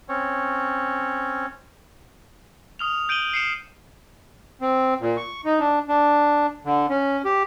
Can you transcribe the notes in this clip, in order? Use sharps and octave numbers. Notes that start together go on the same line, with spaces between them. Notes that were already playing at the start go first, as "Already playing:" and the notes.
C4 C#4 C#5
D#6 F6 F7
G6 D7 D#7 F#7 G7
C7 C#7 E7
C4
A#2
C#6
D#4
D4
D4
D3
C#4
G4